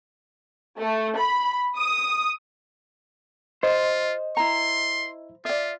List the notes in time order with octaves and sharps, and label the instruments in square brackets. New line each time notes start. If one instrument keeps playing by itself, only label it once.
[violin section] A3
B5
D#6
[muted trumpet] F4 [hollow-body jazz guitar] C5 [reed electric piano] D#5
[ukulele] E4 A#5 [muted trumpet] C6
[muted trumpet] F4 [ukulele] D5 E5